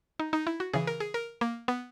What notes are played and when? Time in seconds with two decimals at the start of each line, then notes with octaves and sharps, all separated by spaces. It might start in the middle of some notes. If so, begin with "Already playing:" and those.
0.20 D#4
0.33 D#4
0.47 E4
0.60 F#4
0.73 C#3 E3 G#4
0.87 A#4
1.00 G#4
1.14 A#4
1.41 A#3
1.68 B3